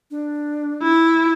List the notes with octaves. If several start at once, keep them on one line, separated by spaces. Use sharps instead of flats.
D4
E4